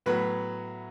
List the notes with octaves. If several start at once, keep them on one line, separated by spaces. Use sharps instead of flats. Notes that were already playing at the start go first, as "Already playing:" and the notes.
A2 F#3 B3 B4